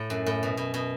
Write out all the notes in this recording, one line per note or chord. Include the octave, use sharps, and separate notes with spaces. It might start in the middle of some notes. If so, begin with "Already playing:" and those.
Already playing: A2
F#2
A2
B2
B2
B2